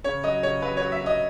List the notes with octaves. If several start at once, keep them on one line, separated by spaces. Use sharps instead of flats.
C#3 C#5
F#3 D#5
C#3 C#5
F#3 B4
F#3 C#5
E5
F#3 D#5